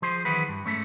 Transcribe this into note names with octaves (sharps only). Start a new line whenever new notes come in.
F3 G#4 C5
D#3 E3 F#3 F#4 G#4 B4
G2
G#2 A3 C#4